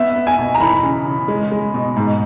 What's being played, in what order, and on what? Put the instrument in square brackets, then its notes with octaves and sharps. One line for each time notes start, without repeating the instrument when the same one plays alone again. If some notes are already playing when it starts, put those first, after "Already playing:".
Already playing: [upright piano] B3 E5
B3
G#5
B2
A#5
E3 B5
C#3
C#3
G#3
G#3
B2
G#2